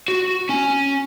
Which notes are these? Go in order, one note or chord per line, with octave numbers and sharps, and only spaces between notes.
F#4
C#4 G#5